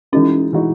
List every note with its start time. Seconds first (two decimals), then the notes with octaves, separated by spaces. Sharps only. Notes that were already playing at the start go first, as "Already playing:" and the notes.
0.12 E3 G#3 C#4 D#4 F#4
0.53 E3 G#3 D#4 F#4